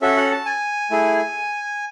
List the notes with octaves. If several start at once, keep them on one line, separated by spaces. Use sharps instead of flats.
C#4 F#4 A4 E5
F#5
A5
G#5
A3 E4 G#4